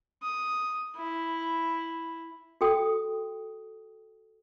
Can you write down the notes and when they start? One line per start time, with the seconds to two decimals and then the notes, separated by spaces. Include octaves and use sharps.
0.22 D#6
0.97 E4
2.61 F#4 A4 G5 D#6